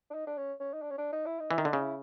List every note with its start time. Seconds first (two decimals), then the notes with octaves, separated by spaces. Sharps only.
0.11 D4
0.14 D#4
0.27 D4
0.37 C#4
0.60 C#4
0.73 D#4
0.82 D4
0.91 C#4
0.98 D4
1.13 D#4
1.26 E4
1.40 D#4
1.51 E3
1.54 D#3 E4
1.65 D3 D#4
1.73 C#3
1.81 E4